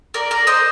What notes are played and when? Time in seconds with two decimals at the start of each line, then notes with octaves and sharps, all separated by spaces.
0.14 A#4 D5
0.31 A#4 D5
0.47 C5 D#5